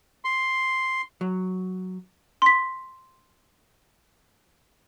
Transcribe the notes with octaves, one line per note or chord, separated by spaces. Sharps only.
C6
F#3
C6 B6